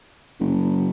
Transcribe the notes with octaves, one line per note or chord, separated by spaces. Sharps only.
F#1